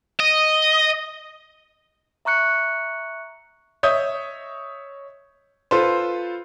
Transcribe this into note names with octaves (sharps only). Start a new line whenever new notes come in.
D#5
E5 A#5 C#6 F#6 C#7
C#5 D#5 E5 D#6 G6
F4 A4 B4 C5